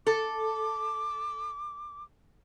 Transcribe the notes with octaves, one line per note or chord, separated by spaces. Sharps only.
A4 D6